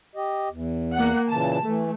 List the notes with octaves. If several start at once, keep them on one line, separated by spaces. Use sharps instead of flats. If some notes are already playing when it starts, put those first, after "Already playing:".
G4 D#5
E2
A#3 F#5
A#2 C#3 E3 A5
E3 A3